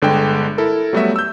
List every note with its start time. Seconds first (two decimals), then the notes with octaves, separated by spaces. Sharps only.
0.02 G1 D3 G#3 G5
0.58 E4 A4 A#4
0.93 F#3 G3 A3 B3 F#4 E5
1.16 E6 G6